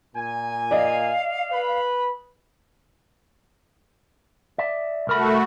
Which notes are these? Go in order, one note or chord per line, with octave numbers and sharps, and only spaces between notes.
A#2 G#5
D5 D#5 F5
B4 B5
D5 E5
C2 A3 F#4 A#4 B5